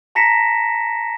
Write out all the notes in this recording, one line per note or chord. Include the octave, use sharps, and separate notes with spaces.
A5 A#5 A#6 B6 C#7 E7